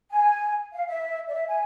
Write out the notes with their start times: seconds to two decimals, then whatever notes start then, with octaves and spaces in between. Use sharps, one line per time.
0.11 G#5
0.72 F5
0.87 E5
1.28 D5
1.33 E5
1.48 G#5